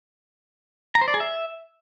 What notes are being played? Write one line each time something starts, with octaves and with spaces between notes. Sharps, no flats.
A#5
C5
D5
G#4
E5